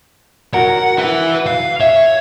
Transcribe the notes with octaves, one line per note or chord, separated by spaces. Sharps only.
F#4 A#4 F#5
E4 B4
F5
C#5 E5